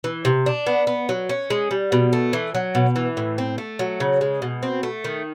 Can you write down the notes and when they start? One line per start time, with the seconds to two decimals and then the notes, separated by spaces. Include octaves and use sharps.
0.04 E3
0.25 C3
0.46 D4
0.67 B3
0.87 B3
1.09 F#3
1.29 C#4
1.50 G#3
1.71 G3
1.92 B2
2.13 A3
2.33 E3
2.55 F#3
2.75 B2
2.96 E3
3.17 A2
3.38 C4
3.58 A3
3.79 F#3
4.00 C#3
4.21 G#3
4.42 B2
4.63 C4
4.83 A3
5.04 D#3